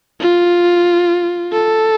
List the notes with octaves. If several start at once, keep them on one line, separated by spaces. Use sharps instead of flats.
F4
A4